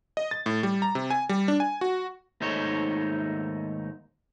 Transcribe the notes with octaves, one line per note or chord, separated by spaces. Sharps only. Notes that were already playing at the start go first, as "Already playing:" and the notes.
D#5
A6
A2
G3
A#5
C3
G#5
G3
D4
G#5
F#4
D#2 G#2 A3 D#4 C5 C#5